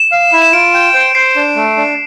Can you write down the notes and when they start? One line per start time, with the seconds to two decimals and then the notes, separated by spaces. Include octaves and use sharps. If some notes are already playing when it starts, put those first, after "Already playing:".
Already playing: E7
0.12 F5
0.32 E4
0.42 E7
0.52 F4 D7
0.74 G5
0.94 C5
1.15 C5 C7
1.36 D4
1.56 A3
1.77 D4